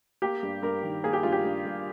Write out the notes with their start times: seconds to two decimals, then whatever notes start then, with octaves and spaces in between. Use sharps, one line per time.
0.22 A#3 G4
0.43 G2
0.62 G2 A#4
0.83 D#3
1.04 A#3 G#4
1.13 G4
1.23 G2 F4
1.32 G4
1.44 G2
1.65 G2